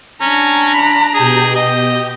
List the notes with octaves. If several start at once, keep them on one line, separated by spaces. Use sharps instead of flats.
C#4 D4 A#5
B5
B2 G4 G#4 G6
D#5